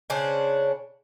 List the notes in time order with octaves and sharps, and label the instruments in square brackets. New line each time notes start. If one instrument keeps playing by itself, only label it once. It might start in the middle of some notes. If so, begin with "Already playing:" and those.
[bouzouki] C#3 C#4 D4 C5